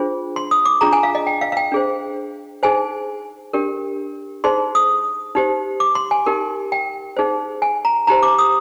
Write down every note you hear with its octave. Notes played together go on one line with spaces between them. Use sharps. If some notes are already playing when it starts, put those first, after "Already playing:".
Already playing: D4 F4 G#4 C5
C6
D#6
D6
D4 F4 G#4 A#5
G#5
F5
D#5
G5
F5
F5
G5
D4 G#4 C5
D#4 G#4 C5 G#5
D4 G4 A#4
D#4 G#4 C5 C6
D#6
D#4 G4 C5
D6
C6
G#5
D#4 G4 A#4
G5
D#4 G#4 C5
G#5
A#5
D#4 G4 C5 A#5
D6
D#6